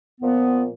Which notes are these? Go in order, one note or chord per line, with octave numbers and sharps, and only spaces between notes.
A#2 F3 B3